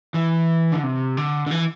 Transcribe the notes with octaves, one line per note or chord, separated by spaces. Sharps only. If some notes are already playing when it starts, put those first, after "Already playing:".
E3
D3
C3
D3
D3
E3